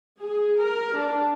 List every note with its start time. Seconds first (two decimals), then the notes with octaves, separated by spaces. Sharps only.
0.20 G#4
0.60 A#4
0.96 D4